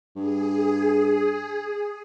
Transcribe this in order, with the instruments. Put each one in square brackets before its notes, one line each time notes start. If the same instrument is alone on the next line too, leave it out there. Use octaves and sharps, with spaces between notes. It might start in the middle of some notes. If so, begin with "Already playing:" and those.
[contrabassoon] G2 [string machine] G#4